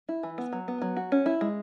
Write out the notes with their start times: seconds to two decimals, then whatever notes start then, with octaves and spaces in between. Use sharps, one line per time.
0.09 E4
0.23 E3
0.38 B3
0.53 F#3
0.68 B3
0.82 F#3
0.97 F#4
1.12 C#4
1.26 E4
1.41 G#3